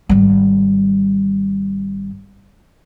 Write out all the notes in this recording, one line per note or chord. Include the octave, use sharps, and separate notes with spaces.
G#1 G3